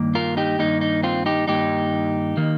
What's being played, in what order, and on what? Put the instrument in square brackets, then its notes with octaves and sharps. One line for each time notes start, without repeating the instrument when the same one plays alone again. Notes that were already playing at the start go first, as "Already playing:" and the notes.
Already playing: [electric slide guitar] G2 D#3 A#3
F4 A#4
D#4 G4
G2 D#3 A#3 D#4
D#4
C4 F4
D#4 G4
G2 D#3 A#3 D#4 G4
D#3 A#3